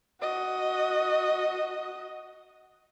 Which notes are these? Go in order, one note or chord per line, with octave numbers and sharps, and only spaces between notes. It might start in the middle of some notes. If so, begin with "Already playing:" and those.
F#4 D#5